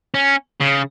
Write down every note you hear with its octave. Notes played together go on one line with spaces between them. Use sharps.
C#4
C#3